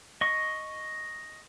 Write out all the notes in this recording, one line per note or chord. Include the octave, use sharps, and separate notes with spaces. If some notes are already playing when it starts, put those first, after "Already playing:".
D#5 C#6